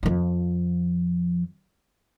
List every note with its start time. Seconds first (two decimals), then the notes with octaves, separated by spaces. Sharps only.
0.03 F2 F3